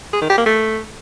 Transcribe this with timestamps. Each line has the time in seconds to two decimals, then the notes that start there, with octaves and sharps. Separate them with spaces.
0.13 G#4
0.22 D#3
0.30 G4
0.38 A#3
0.46 A3